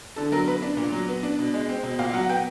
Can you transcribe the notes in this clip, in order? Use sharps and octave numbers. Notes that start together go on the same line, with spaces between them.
D3 A4
F#3 A#4
B3 B4
D4
A#2
F#3
B3
D4
B2
G#3
C4
B2
A#2 F5
F#3 F#5
F#5
B3 G5